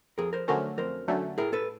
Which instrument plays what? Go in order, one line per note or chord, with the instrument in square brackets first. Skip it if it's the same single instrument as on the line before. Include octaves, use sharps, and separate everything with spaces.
[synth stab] F2 [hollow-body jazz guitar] G#4 A#4
[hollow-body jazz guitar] A#4 C5
[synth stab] D3 F#3 A3 C#4 [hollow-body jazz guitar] A#4 C5
[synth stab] F2 [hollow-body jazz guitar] A#4 C5
[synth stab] D3 F#3 A3 C#4
[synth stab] A2 [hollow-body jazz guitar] G#4 A#4
[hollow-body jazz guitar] A4 B4